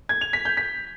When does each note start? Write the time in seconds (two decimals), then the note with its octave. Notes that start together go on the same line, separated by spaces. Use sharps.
0.09 G#6
0.21 F7
0.33 B6
0.45 G6
0.57 B6